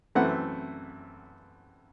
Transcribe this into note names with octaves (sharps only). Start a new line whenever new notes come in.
F#2 E3 A3 C4 F#5